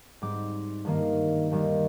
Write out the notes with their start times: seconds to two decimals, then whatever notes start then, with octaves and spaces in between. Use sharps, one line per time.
0.22 G#2 G3 C4 D6
0.85 G2 D#3 A#3
1.52 D#2 D#3 G3